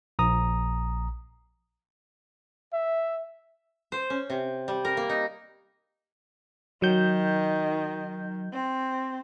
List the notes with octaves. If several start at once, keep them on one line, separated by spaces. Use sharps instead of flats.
A#1 A#5 D#6
E5
C5
C#4
C3
G3
A#4
A#3
D#4
D#3 F#3 G6
C4